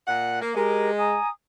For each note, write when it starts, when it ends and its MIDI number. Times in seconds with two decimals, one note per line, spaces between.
0.07 0.39 46
0.07 0.39 78
0.42 0.55 58
0.55 1.15 56
0.55 0.91 67
0.55 0.91 70
0.98 1.29 80
0.98 1.29 82
0.98 1.29 87